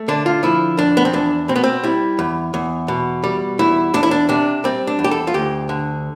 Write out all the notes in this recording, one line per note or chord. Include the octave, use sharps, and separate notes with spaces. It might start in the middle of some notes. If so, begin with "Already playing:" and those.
Already playing: A3
D3 D4
F4
F3 E4
F2 D4
B3
C4
E2 D4
B2 C4
B3
C4
G3 E4
E2
E2
B2
G3
E2 E4
E2 D4
E4
D4
C3 D4
G3 C4
D4
E2
G4
A4
F4
D2 G4
D3